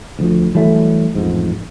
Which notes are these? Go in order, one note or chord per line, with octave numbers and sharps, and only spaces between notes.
D2 F3
E3 F#3 G3 A3
A1 F2 G#2